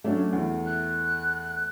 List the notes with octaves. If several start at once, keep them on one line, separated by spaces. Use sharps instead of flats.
F#3 A3 C#4 D4
E2
F#6